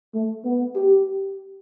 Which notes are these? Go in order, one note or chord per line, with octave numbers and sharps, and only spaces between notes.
A3
B3
G4